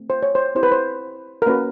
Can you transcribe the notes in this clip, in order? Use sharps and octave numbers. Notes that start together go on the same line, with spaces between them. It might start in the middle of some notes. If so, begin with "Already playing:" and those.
Already playing: A3 C4
C5
C#5
C5
C4 E4 G4 C5
B4
C5
A#4
A#3 C#4 F#4 B4